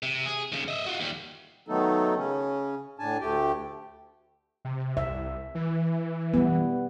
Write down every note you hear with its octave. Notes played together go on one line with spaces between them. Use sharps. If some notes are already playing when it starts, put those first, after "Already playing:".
C3
G#4
D#2 C#3
D#5 E5
F4 F#4
D#2 G3
D#3 F#3 A3 B3 D#4 A4
C#3 C#4
A2 D4 G#5 A5
D2 A3 G4 G5
C3
C2 E5
E3
G3 B3